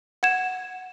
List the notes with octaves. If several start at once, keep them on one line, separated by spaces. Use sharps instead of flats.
F#5 G#6 E7